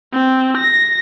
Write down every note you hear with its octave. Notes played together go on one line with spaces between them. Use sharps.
C4
A#6